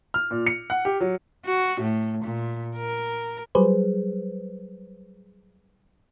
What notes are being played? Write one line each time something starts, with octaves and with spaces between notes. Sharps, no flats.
F6
A#2
C#7
F#5
G4
F#3
F#4
A2
A#2
A#4
F#3 G3 G#4 B4 C5